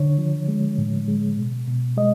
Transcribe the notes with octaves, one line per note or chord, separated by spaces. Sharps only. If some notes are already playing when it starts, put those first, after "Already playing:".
Already playing: D3 C#5
F3
G#3
A2
G#3
B2
B2
G#3 D#5